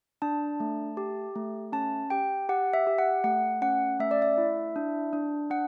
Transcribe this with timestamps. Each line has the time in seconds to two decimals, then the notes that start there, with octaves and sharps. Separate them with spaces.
0.22 D4 A5
0.60 A3
0.97 G4
1.36 A3
1.72 C#4 A5
2.10 G4 G5
2.49 G4 F#5
2.74 E5
2.87 G4
2.98 F#5
3.24 A3 F#5
3.62 C#4 F#5
3.99 A3 E5
4.11 D5
4.22 E5
4.38 E4
4.76 D4
5.13 D4
5.50 D4 F#5